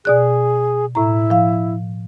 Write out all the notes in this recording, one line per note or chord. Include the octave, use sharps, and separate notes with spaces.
B2 G#4 D5 F#6
A2 E4 A#5
F3 F5